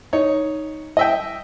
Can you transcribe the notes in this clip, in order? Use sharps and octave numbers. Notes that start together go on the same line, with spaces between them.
D#4 C#5
D#5 E5 G5